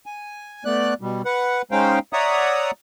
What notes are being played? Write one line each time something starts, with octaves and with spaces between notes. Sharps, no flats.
G#5
A3 B3 D5 F#6
B2 G3
B4 F#5
G#3 C#4 D#4 C5 F5 G5
C#5 D5 E5 F#5 A#5 D#6